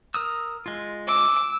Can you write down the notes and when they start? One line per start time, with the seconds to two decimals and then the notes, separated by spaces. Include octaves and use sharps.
0.14 A#4 D#6 E6
0.66 G#3 F4
1.08 D6 E6